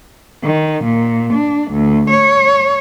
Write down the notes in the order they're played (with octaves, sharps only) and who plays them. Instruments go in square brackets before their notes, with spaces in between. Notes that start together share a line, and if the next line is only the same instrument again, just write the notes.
[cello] D#3
A#2
D4
D2
C#5